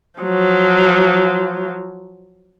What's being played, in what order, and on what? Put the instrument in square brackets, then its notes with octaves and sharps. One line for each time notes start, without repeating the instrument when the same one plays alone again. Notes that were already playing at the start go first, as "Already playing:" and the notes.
[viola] F3 F#3